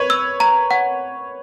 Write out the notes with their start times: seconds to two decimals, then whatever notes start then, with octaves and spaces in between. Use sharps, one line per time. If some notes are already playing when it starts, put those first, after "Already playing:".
Already playing: B4 C#5
0.10 E6
0.40 A#5
0.71 F#5